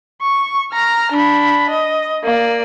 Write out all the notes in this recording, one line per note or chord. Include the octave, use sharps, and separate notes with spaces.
C#6
A#5 F6
D4 B5
D#5
A#3 D5